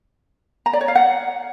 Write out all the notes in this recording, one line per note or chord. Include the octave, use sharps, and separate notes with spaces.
A#5
D5
C#5
F5
F#5